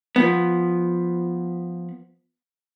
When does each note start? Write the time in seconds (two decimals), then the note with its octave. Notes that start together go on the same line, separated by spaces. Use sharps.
0.16 F3 B3